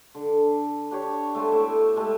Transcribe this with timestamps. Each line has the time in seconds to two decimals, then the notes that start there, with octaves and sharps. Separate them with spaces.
0.14 D3
0.91 D4 G4 C#5
1.35 A3 B3 A5 C6
1.52 A2 E5 D6
1.96 G#3 A3 G4